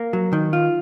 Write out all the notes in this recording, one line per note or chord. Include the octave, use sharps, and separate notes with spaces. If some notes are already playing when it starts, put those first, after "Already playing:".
Already playing: A#3
F#3
D#3
F4